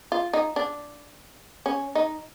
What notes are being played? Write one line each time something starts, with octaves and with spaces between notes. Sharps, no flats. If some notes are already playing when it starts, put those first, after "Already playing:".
F4
D#4
D4
C#4
D#4